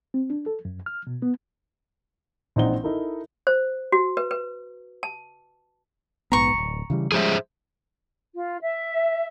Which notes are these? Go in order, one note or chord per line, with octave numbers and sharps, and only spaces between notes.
C4
D4
A4
F#2
F6
B2
B3
A#1 E3 C4 D#4 F#5 G7
D#4 E4 A4 A#4
C5
F#4
B4
B4
A5
A#1 G#2 B3 A#5 C#6
D1 C2
C#3 E3 G3
F3 G3 G#3 G#4 C5 E5
F4
E5